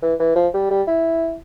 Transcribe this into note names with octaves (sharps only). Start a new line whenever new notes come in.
E3
E3
F3
G3
G3
E4